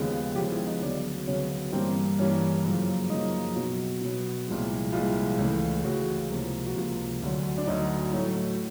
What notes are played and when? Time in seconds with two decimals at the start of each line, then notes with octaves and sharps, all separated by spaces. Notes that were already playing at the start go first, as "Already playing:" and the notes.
Already playing: D#2 C#3 F3 G#3 B3
0.35 D#2 C#3 F3 G#3 B3 G4
0.52 E4
0.67 D#4
0.82 D2 C#3 F#3 B3 D4
1.27 D2 C#3 F#3 B3 C#4
1.73 G2 E3 G3 A#3 C4
2.19 G2 E3 G3 A#3 C#4
2.65 F#2 C#3 F3 A#3
3.10 F#2 C#3 F3 A#3 D#4
3.55 B2 F#3 B3
4.01 B2 F#3 B3
4.47 C2 A#2 F3 G#3
4.92 C2 A#2 F3 G#3 F4
5.39 C#2 C#3 E3 A3
5.84 C#2 C#3 E3 A3 F#4
6.29 C#2 C3 F3 A#3
6.67 F#4
6.75 C#2 C3 F3 A#3 F4
7.22 D2 D3 F#3
7.58 D4
7.67 D2 D3 F#3 D#4
8.13 A2 F#3 A3